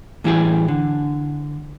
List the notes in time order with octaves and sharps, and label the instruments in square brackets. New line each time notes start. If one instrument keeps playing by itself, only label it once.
[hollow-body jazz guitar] A2 E3 G3 E4 G4 G#4
D3